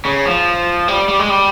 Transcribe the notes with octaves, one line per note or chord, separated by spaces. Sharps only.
C#3
F3
G3
G3
G#3
G3